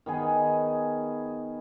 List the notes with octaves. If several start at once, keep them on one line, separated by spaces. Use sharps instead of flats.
D#3 B3 G#4